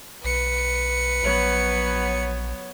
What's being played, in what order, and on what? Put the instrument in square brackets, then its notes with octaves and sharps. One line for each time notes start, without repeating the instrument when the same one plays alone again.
[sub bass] B1 [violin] B4 C#7
[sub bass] A#1 [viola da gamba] F#3 B3 C#5